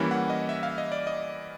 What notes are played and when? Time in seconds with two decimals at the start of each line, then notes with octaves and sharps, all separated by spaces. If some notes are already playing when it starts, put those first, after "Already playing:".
Already playing: E3 G3 A#3 C#4 E4
0.11 F#5
0.30 D#5
0.49 E5
0.63 F5
0.78 D#5
0.92 D5
1.07 D#5